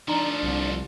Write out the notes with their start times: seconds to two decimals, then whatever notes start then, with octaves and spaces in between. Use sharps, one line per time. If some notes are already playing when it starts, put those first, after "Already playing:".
0.08 F3 A3 D4 D#4 A#5 C#7
0.43 C2